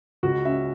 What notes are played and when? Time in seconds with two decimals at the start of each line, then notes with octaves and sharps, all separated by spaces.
0.23 C#2 F#4
0.45 C#4 E5